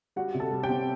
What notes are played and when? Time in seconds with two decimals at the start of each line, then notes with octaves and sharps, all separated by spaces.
0.16 G3 F#4 F#5
0.34 C3
0.40 A4 A5
0.52 G3
0.63 G4 G5
0.69 C4